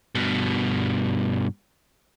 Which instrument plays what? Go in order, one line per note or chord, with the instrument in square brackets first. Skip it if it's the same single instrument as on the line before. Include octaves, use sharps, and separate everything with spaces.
[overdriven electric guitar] G2 B2